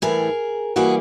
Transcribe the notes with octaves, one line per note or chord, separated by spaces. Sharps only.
A2 E3 G3 G#4 A#4
E3 G3 A#3 F#4 G#4